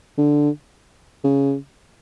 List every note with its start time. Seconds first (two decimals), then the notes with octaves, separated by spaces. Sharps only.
0.18 D3
1.24 C#3